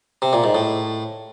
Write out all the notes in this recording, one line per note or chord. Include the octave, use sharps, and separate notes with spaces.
C3
A#2
G#2
A2